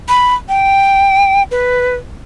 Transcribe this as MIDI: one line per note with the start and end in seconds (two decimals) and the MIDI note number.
0.09 0.34 83
0.49 1.43 79
1.51 1.95 71